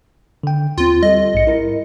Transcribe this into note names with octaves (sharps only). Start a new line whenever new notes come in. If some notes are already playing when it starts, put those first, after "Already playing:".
D3 G5
D#2 C4 F4
G3 A4 D#5
A#1 G#2 C#7
E4 A#4